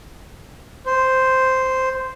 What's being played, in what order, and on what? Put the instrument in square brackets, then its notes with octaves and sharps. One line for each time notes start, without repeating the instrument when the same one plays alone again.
[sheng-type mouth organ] C5